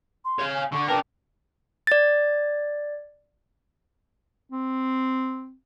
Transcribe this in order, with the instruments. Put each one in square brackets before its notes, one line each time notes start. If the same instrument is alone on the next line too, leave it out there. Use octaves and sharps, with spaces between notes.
[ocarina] C6
[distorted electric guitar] C#5 F5
[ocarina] G#5
[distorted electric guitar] D3 [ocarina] C#6
[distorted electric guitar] D4 A#4 [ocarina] B4 [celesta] G5 A5 D6
[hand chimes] D5 A6
[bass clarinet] C4